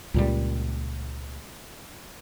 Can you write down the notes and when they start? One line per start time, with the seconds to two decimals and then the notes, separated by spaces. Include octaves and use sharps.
0.14 C#2 A#2 G3